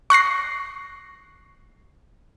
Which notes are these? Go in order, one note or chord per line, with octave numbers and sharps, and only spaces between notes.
C#6 F#6 A#6 C7